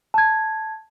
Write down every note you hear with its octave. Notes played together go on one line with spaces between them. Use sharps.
A5 G#6